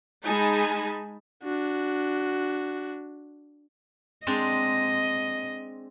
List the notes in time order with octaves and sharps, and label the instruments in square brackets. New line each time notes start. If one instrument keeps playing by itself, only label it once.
[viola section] G#3 D#4 G#5 A5 B5
[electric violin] D4 F#4
[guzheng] G#3 C4 D4 [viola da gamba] D#5